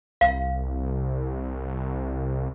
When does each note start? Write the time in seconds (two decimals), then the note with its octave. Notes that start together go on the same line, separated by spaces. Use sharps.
0.21 C2 F5